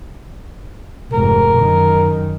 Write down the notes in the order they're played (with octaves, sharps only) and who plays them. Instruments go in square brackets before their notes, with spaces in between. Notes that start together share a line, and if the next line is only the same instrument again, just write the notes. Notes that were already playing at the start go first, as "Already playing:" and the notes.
[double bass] F1 G#2 [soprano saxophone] A#4
[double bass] F#2 D#3